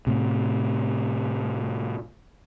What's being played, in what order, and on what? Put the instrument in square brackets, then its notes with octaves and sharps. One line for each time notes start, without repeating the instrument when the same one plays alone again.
[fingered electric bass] A2 C3